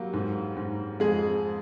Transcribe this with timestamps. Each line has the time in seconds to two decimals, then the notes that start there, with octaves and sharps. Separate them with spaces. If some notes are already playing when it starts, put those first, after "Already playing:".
Already playing: F#3 G3 A#3
0.13 G#2
0.57 G#2
1.00 F2 G#3 G#4